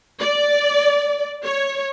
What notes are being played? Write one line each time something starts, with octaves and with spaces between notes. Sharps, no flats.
D5
C#5